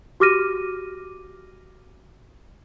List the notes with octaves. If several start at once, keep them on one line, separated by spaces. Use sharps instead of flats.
F#4 G4 D6 F6 A#6 D#7